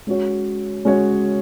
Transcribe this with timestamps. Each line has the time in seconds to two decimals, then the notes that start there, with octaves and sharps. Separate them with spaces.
0.07 G#3 C#4 F#4 C#5
0.85 G#3 C#4 F#4 C#5